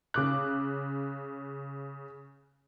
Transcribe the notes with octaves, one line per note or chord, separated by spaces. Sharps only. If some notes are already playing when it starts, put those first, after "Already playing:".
C#3 D6 F#6